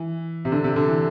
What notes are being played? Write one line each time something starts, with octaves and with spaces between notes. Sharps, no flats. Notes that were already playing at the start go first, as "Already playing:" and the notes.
Already playing: E3
C3
D3
C3
D3
E3